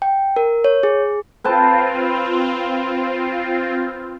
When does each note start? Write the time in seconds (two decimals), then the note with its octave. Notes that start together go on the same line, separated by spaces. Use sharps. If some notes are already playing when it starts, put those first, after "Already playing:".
0.02 G5
0.36 A#4
0.64 C#5
0.83 G#4
1.44 C4 F4 B4 G5 A5